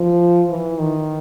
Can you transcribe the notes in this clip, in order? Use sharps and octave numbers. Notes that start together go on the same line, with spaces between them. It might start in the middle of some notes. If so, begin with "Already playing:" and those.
Already playing: F3
E3
D#3